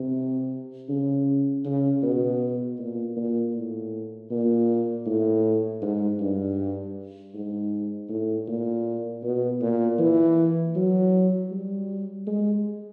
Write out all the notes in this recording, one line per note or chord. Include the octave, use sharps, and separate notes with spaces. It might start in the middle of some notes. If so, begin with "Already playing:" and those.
Already playing: C3
C#3
C#3
B2
A#2
A#2
A2
A#2
A2
G#2
G2
G#2
A2
A#2
B2
A#2
E3
F#3
G3
G#3